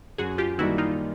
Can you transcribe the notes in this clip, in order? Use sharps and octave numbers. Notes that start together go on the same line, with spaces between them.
F#2 F#4 G#4
F4 G4
D#3 G3 A#3 D#4 E4 F#4
D#4 F4